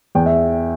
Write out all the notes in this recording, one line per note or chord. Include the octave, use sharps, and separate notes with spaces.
E2 G5
E5